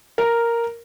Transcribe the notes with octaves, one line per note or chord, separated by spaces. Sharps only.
A#4